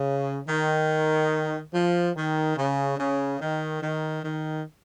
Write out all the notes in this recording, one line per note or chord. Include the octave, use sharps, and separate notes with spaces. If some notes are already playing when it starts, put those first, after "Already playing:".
Already playing: C#3
D#3
F3
D#3
C#3
C#3
D#3
D#3
D#3